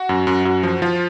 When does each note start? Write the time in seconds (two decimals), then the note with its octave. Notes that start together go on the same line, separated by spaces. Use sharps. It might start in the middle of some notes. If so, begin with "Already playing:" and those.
Already playing: F#4
0.09 F#2
0.27 F#2
0.45 F#2 F#4
0.63 F3
0.82 F3 F4